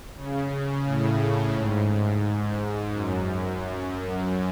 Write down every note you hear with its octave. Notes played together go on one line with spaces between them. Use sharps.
C#3
A2
G#2
F#2
F#2